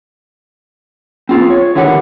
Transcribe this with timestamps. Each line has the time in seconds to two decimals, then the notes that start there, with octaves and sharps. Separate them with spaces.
1.29 C4 F4 G#4
1.50 C#5
1.75 D3 D#3 E4 G4 F#5